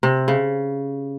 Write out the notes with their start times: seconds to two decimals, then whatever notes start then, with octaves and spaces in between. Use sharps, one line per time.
0.03 C3
0.28 C#3